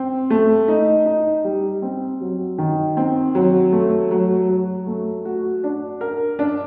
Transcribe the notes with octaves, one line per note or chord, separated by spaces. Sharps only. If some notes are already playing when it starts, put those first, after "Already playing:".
Already playing: C4
A3
D#4
D#4
G3
C4
F#3
D#3
C4
F#3
A3
F#3
F#3
A3
F#4
D4
A#4
D4